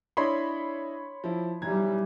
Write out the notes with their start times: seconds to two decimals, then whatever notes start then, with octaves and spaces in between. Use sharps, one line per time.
0.17 D4 E4 C#5 D#5 B5 C6
1.24 F3 E4
1.62 B1 E3 G3 A#5 G#6